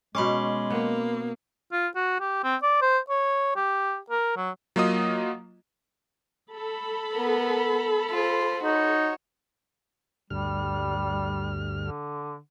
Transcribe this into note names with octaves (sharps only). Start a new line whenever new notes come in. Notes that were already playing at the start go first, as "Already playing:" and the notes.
B2 G#3 C#4 B5 C6 D6
A#3 B3
F4
F#4
G4
C4
D5
C5
C#5
G4
A#4
F#3
F#3 A#3 F4 D#5 D#6
A4 B5
B3 A#4
F4 C5
D#4 F#4 C#5
D2 G2 G3 F6
D3